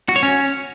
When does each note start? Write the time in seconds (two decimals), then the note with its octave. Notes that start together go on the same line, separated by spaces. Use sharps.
0.09 F#4
0.16 C#5
0.23 C#4